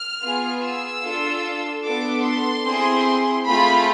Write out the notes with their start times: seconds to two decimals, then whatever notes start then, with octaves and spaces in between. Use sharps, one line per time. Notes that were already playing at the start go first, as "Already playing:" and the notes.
Already playing: F6
0.21 B3 F4 G#4
0.63 E6
1.03 D4 F4 A4
1.84 B3 D4 A4 D6
2.25 C6
2.64 C4 E4 G#4
3.46 A3 C4 F4 G#4 B5